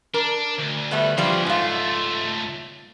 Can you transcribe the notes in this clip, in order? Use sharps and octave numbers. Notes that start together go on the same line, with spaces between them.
D4 A#4
D2
G3 A3 B3
B2 E3 F3 G3
C#2 G#2 A3 F4